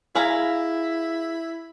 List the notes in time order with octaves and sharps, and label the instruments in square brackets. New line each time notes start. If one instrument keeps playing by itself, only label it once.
[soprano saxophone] E4 [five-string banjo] G#4 F5 A#5